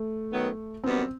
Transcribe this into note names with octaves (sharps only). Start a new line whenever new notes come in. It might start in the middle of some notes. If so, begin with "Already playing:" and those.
Already playing: A3
F#2 D#3 F#3 B3
F#2 D#3 G3 B3 C4